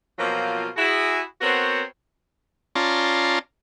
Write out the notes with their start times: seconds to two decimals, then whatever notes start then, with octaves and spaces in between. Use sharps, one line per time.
0.19 B2 F3 F#3 A#3 C4 F4
0.77 E4 F#4 G#4
1.41 B3 C4 F#4 A#4 C5 C#5
2.75 C#4 F4 D5 A5 A#5 C6